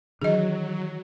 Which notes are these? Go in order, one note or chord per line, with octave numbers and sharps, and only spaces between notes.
D#3 E3 F#3 D4 G#4 D#5